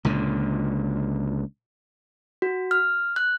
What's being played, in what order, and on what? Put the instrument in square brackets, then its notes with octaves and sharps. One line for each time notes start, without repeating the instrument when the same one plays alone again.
[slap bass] C#2 A#2 D3
[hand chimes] F#4
F6
F#6